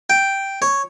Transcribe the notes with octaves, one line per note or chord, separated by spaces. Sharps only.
G5
C#5